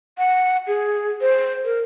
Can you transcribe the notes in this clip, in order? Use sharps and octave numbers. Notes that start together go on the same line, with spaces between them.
F#5
G#4
C5
A#4